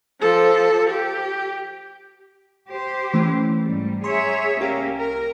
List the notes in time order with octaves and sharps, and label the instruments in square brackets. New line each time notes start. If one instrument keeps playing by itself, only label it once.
[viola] F3 A4
G4
[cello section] G4 C5
[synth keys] E3 A3 C#4
[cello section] G#2 G3
[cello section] G#4 C#5 E5 [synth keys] A#5 C6
[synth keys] C2 G4 G5 [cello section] A#3 C#4
[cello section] A#4